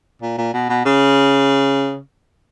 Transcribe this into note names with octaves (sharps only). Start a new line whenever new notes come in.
A#2
A#2
B2
B2
C#3